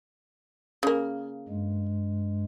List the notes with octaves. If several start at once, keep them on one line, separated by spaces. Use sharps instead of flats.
C#3 A#3
G2 G#3